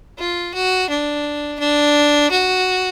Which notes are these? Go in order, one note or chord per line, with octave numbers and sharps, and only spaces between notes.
F4
F#4
D4
D4
F#4